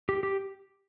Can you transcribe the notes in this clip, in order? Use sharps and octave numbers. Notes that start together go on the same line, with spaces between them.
G4
G4